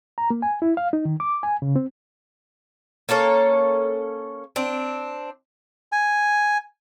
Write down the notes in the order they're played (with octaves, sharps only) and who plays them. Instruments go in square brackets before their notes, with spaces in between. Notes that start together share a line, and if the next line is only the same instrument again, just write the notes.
[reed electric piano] A#5
A#3
G#5
E4
F5
D#4
D#3
D6
G#5
C#3
C4
[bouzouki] A#3 C#4 A4 C#5
C4 D4
[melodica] G#5